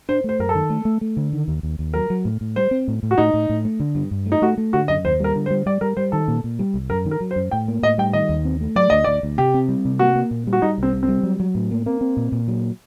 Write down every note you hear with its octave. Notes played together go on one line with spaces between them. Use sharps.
D4 C5
A3 C5
F#2 A#4
A4
D#3
A3
A3
A3
D3
D#3
D#2
D#2
D#2
F#3 A#4
F#3
A2
A2
G3 C5
C4
A2
A2
F#4
A2 D#4
A2
A2
A3
D3
G2
G2
A3
D#4
A3 F#4
A3
D3 F#4
F#2 D#5
D#2 C5
G3 A#4
D3
C5
G3
G3 D5
G3 A#4
G3 C5
D#3 A4
A#2
A#2
G3
C2
F#2 A#4
D#3
A#4
F#3
C5
F#2
A2 G5
A#3
A2 D#5
G3 G5
D#3 D#5
D#2
C4
A3
F#3 D5
D2 D#5
D2 D5
D2
C3 G4
C4
G3
C3
A#3 F#4
A#3
A#2
G3
F#4
G3 D#4
C2 C4
C3
C4
G3
F#3
F#3
A2
A#3
A#3 C4
C4
A#2
A#2
F#3